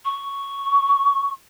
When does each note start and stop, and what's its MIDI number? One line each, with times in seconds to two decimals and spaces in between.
0.05 1.30 85